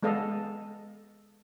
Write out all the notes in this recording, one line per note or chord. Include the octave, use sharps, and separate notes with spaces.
G#3 B3 A4 D#5 F5